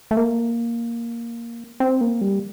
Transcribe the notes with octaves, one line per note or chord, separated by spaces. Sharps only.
A3
A#3
C4
A#3
G3